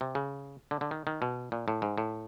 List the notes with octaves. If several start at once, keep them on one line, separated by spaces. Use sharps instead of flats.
C3
C#3
D3
D3
D#3
D#3
B2
A#2
A2
G#2
A2